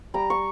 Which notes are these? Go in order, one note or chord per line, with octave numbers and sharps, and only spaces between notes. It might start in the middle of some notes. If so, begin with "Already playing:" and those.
G3 A#5
C#6